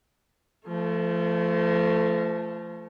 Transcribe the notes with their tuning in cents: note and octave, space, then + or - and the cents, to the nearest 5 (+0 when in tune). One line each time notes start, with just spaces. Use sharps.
F3 -30 A3 +0